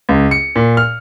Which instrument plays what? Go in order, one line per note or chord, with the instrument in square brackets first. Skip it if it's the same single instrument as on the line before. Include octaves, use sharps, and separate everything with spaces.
[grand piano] C#2
C#7
A#2
F6